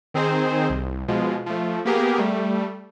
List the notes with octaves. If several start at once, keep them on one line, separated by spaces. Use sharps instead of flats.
D#3 C4 D#4 G#4 C5
C2
B2 F3 G#3
F3 A3
A#3 B3 G4 G#4 A#4
G3 A3